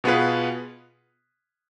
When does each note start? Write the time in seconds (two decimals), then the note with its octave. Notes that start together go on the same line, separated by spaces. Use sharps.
0.04 B2 B3 F4 G#4 B4